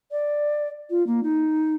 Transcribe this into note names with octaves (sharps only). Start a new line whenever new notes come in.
D5
F4
A#3
D#4